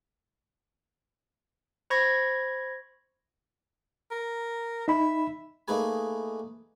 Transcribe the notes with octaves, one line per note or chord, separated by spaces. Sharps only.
C5 B5 C#6 G#6 A#6
A#4
D#4 E5 B5
A3 A#3 D#4 G#4 B4 G#5